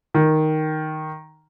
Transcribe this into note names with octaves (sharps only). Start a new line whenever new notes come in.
D#3